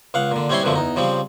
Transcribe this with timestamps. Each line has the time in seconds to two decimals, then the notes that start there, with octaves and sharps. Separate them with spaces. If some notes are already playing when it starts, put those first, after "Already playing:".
0.14 C#2 F5 F#5
0.32 A#2 D3
0.50 G3 C4 C#4 E4 C#5 C6
0.63 F#2 B2 D3 F3 A3
0.75 E2 D#4
0.96 C#3 F3 G3 C4